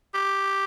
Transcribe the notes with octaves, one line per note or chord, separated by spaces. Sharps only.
G4